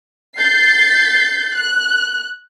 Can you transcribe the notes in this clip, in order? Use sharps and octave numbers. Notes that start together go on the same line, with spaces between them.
G6 A6 C7
F#6